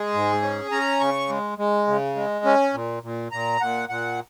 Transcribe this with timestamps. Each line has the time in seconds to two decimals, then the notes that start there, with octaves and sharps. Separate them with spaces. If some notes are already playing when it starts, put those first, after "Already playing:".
Already playing: G#3 G#4
0.14 G#2
0.42 C#4
0.71 C#4 A#5
1.00 C#3 C#6
1.29 G#3
1.58 G#3
1.87 C#3
2.16 G#3
2.45 C#4
2.74 A#2
3.03 A#2
3.31 A#2 A#5
3.61 A#2 F#5
3.89 A#2 F#5